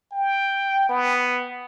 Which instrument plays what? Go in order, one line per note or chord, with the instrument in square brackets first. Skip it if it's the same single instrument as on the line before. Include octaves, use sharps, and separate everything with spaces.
[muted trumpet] G5
B3